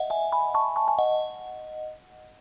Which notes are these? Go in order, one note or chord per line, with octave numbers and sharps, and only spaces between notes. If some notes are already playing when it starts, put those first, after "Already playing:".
Already playing: D#5 E5 F#5
E5 G#5
G#5 B5
A5 C#6
A5 C#6
G#5
D#5 F#5